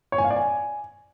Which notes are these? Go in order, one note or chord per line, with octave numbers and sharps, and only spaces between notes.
C#5
G#5
F5
D5
G#5